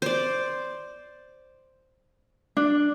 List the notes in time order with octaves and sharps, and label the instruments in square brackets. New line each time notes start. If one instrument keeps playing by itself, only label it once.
[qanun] C5 D5
[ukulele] D4